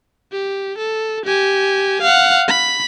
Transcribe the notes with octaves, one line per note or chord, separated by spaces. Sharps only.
G4
A4
G4 G#5
F5 F#5
B5